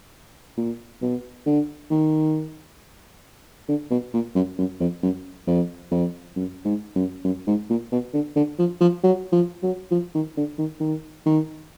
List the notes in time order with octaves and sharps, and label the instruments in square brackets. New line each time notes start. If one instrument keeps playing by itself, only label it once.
[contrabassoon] A#2
B2
D3
D#3
D3
B2
A#2
F#2
F#2
F2
F#2
F2
F2
F#2
G#2
F#2
F#2
G#2
A#2
B2
D3
D3
F3
F3
F#3
F3
F#3
F3
D#3
D3
D#3
D#3
D#3